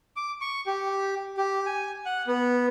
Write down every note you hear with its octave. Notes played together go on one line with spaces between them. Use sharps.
D6
C#6
G4
G4
G#5
F#5
B3